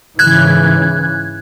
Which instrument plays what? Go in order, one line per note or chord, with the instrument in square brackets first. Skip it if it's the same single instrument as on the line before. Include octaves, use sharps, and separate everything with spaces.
[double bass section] G#2 C#3 E3 [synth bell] F#6 G#6